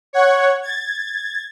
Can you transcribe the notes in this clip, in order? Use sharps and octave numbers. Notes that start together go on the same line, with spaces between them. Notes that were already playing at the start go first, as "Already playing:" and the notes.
C#5 F#5 G#6
G#6 A6